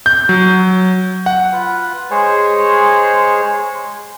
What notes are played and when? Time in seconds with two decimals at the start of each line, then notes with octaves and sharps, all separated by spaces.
0.06 G6
0.29 F#3
1.26 F#5
1.52 F4 B4
2.11 G#3 G#4 C5 C#5